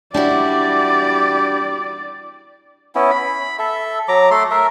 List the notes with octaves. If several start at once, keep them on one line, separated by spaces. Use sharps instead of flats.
G3 D4 E4 F#4 D5
B3 C#4 E4
B5
A4 E5
F#3 A#5 D6
A3 A4 C6
A#4 E5